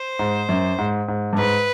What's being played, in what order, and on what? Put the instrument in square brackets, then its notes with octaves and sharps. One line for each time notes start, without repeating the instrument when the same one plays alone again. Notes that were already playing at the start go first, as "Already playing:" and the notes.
Already playing: [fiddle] C5
[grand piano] G#2
F#2
G#2
G#2
G2
[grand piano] G#2 [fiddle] B4